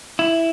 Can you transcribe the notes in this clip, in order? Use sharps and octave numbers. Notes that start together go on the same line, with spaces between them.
E4